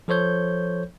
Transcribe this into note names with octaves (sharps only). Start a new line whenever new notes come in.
F3 A4 C5 C#5 G6